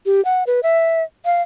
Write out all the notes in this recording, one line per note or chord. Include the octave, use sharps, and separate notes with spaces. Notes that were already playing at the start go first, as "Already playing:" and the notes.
G4
F#5
B4
E5
F5